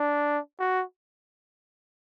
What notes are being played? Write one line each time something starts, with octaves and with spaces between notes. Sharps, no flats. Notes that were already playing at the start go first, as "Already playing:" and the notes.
Already playing: D4
F#4